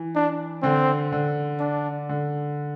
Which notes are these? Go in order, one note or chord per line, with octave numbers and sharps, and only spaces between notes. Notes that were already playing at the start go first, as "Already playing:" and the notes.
Already playing: E3
D4
D3 C4
D3
D4
D3